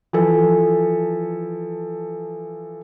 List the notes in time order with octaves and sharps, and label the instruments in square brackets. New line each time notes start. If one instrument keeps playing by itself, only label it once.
[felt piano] E3 F3 A4